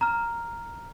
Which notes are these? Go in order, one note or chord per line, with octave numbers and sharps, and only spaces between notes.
A#5 F6